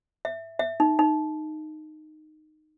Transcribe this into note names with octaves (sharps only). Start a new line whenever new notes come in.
E5
E5
D#4
D#4